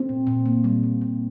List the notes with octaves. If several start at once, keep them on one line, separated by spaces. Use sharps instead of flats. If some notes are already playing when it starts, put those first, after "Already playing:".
Already playing: C4
A#2
A#2
A#3
G3
A#2
A#2